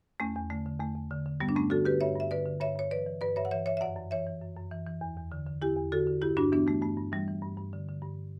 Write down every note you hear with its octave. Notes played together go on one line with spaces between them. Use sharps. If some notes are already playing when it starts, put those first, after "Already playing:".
E2 A3 C#4
E2
D3 A3
D3
E2 A3
E2
D3
D3
G2 G3 B3
D4
G2 A3 C#4
D3 F#4 A4
D3 G4 B4
G2 C#5 E5
G2 E5
D3 B4 D5
D3
G2 C#5 E5
G2 C#5
E3 B4 D5
E3
G2 B4 D5
G2 C#5 E5
F#5
E3 C#5 E5
E3 C#5 E5
E5
F#2 D5 F#5
F#2
E3 C#5 E5
E3
F#2
F#2
E3
E3
E2
E2
D3
D3
E2 E4 G4
E2
D3 F#4 A4
D3
G2 E4 G4
G2 D4 F#4
E3 B3 D4
E3 A3
G2 A3
G2
E3 G3
E3
G2
G2
D3
D3
G2